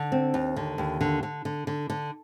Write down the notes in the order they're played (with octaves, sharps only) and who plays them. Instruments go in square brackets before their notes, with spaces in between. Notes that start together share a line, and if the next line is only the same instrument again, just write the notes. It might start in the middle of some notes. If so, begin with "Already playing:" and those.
Already playing: [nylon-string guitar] D3
C4
D#2
D3
D#2
D3
D3
D3
D3
D3